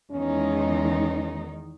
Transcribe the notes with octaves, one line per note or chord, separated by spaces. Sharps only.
E2 D#3 G#3 C#4 D#4